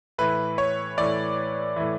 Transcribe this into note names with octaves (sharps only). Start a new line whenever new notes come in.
A2 E3 B4
C#5
A2 E3 D5
A2 E3